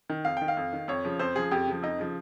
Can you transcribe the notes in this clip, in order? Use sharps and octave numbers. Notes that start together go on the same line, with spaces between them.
D#3
F2 F5
D#3 G5
F5
F2
D#3
F2 C#5
C#3 F3
F2 C5
C#3 F3 G#4
F2 G4
C#3 F3
F2 D#4
C#3 F3